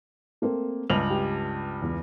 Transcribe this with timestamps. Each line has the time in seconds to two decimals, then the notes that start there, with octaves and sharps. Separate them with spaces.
0.42 A3 A#3 C4
0.90 C#2 G2 F7 F#7
1.10 G4
1.82 E2